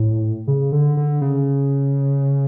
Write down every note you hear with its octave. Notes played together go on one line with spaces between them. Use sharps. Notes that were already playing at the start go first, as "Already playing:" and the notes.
Already playing: A2
C#3
D3
D3
C#3